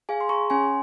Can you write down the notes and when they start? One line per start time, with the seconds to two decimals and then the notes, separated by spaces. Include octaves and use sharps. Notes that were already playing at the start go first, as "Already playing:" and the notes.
0.09 G#4 F5 G#5
0.21 C6
0.29 G#4 A#5 C#6
0.50 C#4 G#5 C6